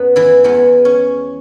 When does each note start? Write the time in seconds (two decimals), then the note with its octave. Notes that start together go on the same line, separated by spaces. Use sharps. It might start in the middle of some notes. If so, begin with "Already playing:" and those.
Already playing: F#2 F#3 B3 B4
0.16 E3 E4
0.44 E2 E3 G#3 B3
0.85 C#4